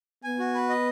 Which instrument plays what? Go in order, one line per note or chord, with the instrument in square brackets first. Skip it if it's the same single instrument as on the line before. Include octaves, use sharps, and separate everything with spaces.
[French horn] B3 [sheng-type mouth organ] G#5
[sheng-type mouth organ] F#4
B4
D#5